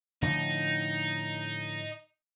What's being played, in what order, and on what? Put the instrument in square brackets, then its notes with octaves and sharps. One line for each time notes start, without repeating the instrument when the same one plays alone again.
[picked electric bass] A2 D3 F3 [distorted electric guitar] D#4